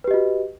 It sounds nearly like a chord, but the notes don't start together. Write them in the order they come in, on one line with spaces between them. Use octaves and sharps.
B4 G4 D#5 F#4